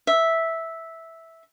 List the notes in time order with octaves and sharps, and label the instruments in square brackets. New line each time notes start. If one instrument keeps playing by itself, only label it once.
[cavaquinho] E5